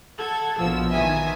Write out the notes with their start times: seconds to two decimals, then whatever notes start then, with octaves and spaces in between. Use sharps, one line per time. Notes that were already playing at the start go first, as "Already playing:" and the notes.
0.19 A4 F#5 G#6
0.57 A#1 B2 F3 E6
0.92 D#3 E3 E5 G#5 D#6